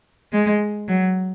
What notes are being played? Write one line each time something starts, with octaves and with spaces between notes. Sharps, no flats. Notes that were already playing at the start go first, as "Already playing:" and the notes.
G#3
F#3